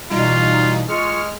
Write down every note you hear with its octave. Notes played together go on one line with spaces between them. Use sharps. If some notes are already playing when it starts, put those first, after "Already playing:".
B2 E3 G3 D#4 F4
G#3 F4 C#6 F6